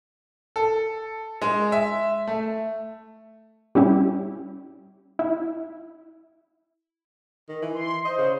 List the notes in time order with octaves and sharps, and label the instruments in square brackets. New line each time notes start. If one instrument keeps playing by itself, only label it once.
[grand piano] A4
G#3
E5
A3
[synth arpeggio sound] G3 C#4 E4 G4
E4
[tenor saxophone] D#3
E3
[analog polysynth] C6
[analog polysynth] C5 [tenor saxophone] D#5
[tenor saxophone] C#3